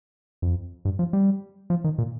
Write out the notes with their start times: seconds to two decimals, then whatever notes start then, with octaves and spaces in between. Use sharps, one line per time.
0.42 F2
0.85 G2
0.99 F3
1.13 G3
1.70 F3
1.84 D#3
1.98 A#2